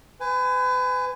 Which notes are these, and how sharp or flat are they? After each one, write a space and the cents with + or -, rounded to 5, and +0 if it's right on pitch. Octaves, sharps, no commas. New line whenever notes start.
B4 +35 G#5 -10